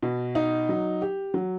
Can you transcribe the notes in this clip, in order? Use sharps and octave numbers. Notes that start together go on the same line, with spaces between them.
B2
D#4
F#3
G4
F#3